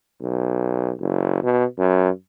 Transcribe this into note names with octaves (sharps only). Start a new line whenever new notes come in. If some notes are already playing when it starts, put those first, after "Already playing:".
B1
F#1
B2
F#2